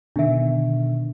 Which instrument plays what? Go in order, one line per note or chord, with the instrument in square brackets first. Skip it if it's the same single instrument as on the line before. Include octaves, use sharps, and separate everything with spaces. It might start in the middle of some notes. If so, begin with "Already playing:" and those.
[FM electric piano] B2 D3 D#3 [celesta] D4 E5